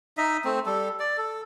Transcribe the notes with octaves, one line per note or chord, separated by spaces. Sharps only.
D#4 D#5 E5
A3 C4
G3 A4
D5
A4